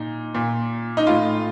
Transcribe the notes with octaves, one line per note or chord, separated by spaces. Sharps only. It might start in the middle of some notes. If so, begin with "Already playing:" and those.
Already playing: A#2 D#4
A#2
D#4
A2 F4